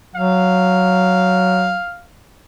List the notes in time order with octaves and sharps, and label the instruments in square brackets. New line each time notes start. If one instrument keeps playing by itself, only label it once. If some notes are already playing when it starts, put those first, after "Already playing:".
[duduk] F#3 [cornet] F5